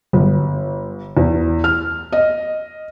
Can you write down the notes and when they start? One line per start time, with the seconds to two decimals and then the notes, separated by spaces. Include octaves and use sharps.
0.13 G1
1.17 E2
1.64 F6
2.12 D#5